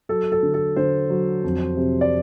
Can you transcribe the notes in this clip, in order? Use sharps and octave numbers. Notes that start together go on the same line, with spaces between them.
F#3 A4
A4
D3
A4
D3 C5
F#3
F2
C3
D5